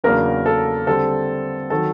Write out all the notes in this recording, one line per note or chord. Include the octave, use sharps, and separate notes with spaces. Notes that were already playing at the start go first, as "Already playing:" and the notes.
E2 C#3 F#3 A#3 D4 A#4
A4
D3 G3 C4 A4
D#3 F#3 A4